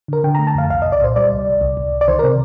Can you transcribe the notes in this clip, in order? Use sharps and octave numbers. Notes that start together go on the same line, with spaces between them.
D3 A#4
D3 G5
A3 A#5
A5
F2 F5
C2 F5
C2 D#5
D5
A#2 C5
G3 D5
C2
C2
C2
C2
C2
D5
D#3 C5
C3 A#4